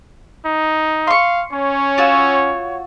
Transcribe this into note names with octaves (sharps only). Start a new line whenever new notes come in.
D#4
F5 C6 C#6
C#4 C#5
F4 F#4 E6